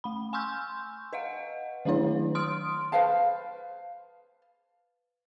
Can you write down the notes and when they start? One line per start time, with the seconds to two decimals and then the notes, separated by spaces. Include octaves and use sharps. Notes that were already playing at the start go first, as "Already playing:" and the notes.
0.04 A3 B5
0.33 G#5 C6 C#6 E6 F6 G6
1.13 B4 D#5 F5 F#5
1.85 D#3 F#3 A3 D4 E4 C#5
2.35 C6 D#6 F6 D7
2.92 B4 C5 F5 A5